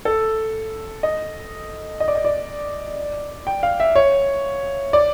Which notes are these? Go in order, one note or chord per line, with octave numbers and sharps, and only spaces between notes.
A4
D#5
D#5
D5
D#5
D5
G5
F5
E5
C#5
D5